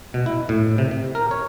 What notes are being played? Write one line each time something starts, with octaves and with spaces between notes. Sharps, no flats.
B2
E4
A2
C3
C3
A#4
C#5